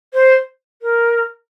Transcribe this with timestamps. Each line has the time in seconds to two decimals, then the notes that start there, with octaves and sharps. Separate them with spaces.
0.14 C5
0.82 A#4